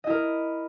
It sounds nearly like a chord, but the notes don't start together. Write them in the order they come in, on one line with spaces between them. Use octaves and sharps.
D#5 E4 A#4